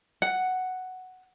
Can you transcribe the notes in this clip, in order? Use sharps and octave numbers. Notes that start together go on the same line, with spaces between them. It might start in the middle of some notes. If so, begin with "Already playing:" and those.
F#5